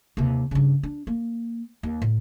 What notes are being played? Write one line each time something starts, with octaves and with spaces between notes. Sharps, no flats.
D#2 C3
G2 C#3
D4
A#3
D#2
A2